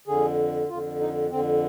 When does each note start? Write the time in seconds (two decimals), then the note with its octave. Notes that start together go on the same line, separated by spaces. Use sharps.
0.07 F2 D3 G#4
0.69 F2 D3 F4
1.00 D#4
1.31 F2 D3 C4